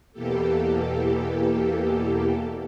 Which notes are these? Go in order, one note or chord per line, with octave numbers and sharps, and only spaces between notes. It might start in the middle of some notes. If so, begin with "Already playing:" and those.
E2 B2 E3 A#3 G4 A4